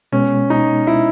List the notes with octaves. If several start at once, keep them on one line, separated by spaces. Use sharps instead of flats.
B2 G#3 B3 C#4
D#4
E4